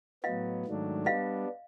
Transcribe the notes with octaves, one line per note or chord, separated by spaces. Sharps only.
A2 F#3 B3 D#5 F5
G#2 D#3 F#3 A3 D4
G3 B3 D4 D#5 F5